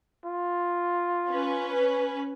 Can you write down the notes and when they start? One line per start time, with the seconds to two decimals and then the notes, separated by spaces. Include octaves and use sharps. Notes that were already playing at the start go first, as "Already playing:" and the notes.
0.25 F4
1.29 C#4 B4